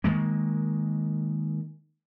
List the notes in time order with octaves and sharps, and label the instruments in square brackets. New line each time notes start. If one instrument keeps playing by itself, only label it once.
[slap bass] D#3 E3 G#3 A#3